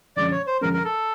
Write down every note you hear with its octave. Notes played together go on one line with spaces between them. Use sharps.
F#2 D3 F3 G#3 C#4 D5
C#5
C5
F#2 D3 F3 G#3 C#4 A#4
A#4
A4